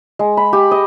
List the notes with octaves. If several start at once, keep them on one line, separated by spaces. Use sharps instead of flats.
G#3
B5
G4
D#5